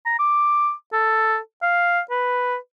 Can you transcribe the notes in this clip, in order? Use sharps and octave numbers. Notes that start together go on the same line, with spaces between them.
A#5
D6
A4
F5
B4